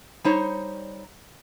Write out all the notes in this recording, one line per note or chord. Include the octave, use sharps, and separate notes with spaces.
G3 D#4 C5 C#5